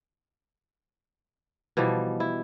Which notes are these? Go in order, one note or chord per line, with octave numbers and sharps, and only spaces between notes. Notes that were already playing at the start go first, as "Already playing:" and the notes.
B2 E3 F3 G3
E4